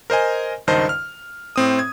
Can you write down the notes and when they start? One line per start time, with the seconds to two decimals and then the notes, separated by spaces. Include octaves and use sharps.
0.10 A#4 C5 D#5 G#5
0.67 C#2 G2 D#3 C5 D#5 A5
0.89 F6
1.56 A2 C4 D#6
1.79 G#6